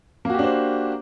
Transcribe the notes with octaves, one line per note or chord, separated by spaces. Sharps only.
A#3 D4 F#4 G4 C5